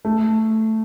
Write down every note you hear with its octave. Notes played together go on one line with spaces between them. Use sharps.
A3